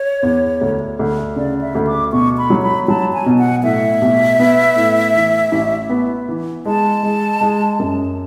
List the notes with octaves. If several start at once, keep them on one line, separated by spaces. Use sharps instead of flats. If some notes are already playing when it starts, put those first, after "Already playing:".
Already playing: C#5
E2
D2
D2
C#3 D5
E5
D2
D6
B2 C#6
B5
F#3
B5
F#3 A5
G#5
B2
F#5
A2 E5
B1
B3
A2
E3
A1
B3
E3
G#3 A5
G#3
G#3
F#2